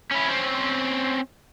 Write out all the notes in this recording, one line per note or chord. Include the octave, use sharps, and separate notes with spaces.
C#4 E4
C4 C#4